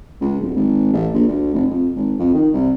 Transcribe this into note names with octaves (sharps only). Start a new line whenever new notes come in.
C#2
D1
G#1
A1
A#1
D2
F1
F2
G#1
F2
D#3
C2